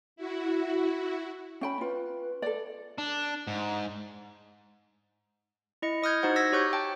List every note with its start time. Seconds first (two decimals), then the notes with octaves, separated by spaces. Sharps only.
0.16 E4 F#4
1.61 C#4 G5 B5
1.81 F4 B4
2.42 A4 D5
2.98 D4
3.47 G#2
5.82 E4 D#5 C#7
6.02 D#5 D#6 F6 G6 G#6
6.23 D#4 F#4 C5 F#5 G6
6.36 E6 G#6 A#6 B6
6.52 G4 C#5 C#6 F#6 G6
6.73 G5 A5